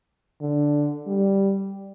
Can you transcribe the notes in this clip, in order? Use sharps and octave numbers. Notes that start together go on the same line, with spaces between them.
D3
G3